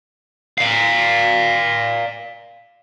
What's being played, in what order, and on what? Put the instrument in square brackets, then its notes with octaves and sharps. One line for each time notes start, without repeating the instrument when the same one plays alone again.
[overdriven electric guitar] D5 F5